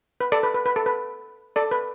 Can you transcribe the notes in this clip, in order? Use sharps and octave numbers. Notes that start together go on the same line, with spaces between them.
B4
A4 D5
B4
B4
B4
A4
B4
A4 D5
B4